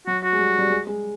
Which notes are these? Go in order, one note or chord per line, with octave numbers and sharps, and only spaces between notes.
F#3 F#4
F#4
G#3
G3
G3
G#3
G#3